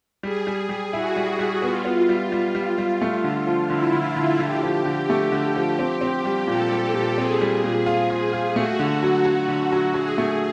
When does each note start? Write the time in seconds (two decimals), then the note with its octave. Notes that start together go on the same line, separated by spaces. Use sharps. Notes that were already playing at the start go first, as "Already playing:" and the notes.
0.23 G3 G#4
0.47 G3
0.69 G3
0.93 E4 F#4
1.16 G3
1.39 G3
1.62 B3 F4
1.85 B3
2.09 G3
2.32 G3
2.55 G3
2.78 G3
3.01 A3
3.24 D3
3.47 F3
3.70 D3 E4
3.93 D3
4.06 F4
4.16 D3
4.40 D3 G4
4.63 F3
4.85 D3
5.10 A3
5.32 D3
5.56 F3
5.79 C4
6.01 C4
6.25 G3
6.47 A#2 A4
6.71 G3
6.94 A#2
7.17 C4 G#4
7.41 G3
7.64 A#2
7.86 F4
8.10 F4
8.33 F4
8.55 A3 F#4
8.79 D3
9.03 F#3
9.25 F#3 F#4
9.49 D3
9.72 F#3
9.94 F#3 G#4
10.18 A3